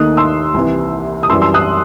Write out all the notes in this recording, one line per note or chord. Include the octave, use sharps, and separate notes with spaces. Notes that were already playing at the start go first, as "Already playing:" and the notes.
Already playing: D#2 D#3 A3 D#4 D#6 F#6
C6 E6
C2 C3 E3
D#6
F#2 E3 G3 C6 E6
C6 E6
D#6 F#6